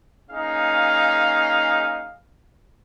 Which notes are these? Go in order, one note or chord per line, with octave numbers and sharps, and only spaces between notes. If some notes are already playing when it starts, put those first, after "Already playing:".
A#3 C#4 D#4 G#4 F5